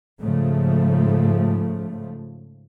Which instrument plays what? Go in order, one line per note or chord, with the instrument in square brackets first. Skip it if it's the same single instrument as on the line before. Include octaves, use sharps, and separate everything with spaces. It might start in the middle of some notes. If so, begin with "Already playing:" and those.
[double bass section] G#2 C#3 F3 A3